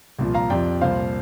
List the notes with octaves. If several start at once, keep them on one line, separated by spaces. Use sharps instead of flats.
C2 A#2 F3
F5 A#5
F2 C3 F3 D5 G5
C2 A#2 F3 C5 F5